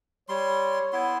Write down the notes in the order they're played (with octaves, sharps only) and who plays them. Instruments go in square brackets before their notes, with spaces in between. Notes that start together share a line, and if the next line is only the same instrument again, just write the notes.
[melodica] G3 C6 [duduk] C#5
[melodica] B3 E4 C6